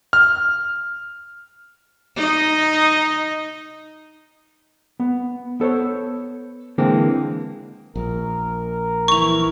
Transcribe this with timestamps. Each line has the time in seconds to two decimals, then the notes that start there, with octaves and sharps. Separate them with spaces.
0.13 F6
2.16 D#4 D#5
5.00 B3
5.60 B3 A4 C5 C#5
6.78 D3 E3 G#3 A#3 C4
7.95 A#1 A#4
9.08 E3 E4 C#6 F7